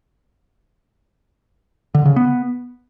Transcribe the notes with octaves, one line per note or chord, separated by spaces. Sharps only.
D3
C#3
B3